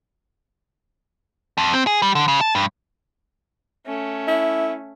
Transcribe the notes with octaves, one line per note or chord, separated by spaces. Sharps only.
F2
C4
G#4
G3
D3
C#3
A5
G2
A3 C#4
E4